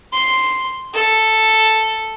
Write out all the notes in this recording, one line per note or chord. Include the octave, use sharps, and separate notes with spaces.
C6
A4